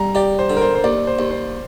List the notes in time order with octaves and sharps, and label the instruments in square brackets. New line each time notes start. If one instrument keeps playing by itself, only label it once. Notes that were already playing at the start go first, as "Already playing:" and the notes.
Already playing: [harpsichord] G3 [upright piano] A#5
[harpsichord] G4 [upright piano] D5
[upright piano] C5
[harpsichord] D3
[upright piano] A#4
C5
C5
[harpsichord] D#2 [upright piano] D5
[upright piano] C5
[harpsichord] D#2
[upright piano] C5